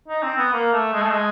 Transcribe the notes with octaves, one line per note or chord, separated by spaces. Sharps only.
D#4
C4
B3
A#3
A3
G#3
A3
G#3